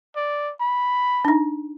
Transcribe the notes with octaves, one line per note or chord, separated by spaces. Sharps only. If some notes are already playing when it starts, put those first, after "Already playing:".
D5
B5
D4 D#4